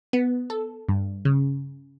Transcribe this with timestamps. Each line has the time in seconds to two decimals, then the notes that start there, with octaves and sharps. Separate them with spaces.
0.13 B3
0.50 A4
0.89 G2
1.25 C#3